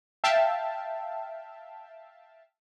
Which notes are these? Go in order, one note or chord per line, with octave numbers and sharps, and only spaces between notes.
E5 F5 G5 A5